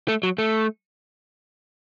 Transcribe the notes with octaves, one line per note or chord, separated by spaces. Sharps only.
A3
F#3
A3